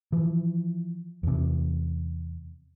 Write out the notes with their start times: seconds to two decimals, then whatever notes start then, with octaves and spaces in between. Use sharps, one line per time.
0.12 E3 F3
1.23 E2 C3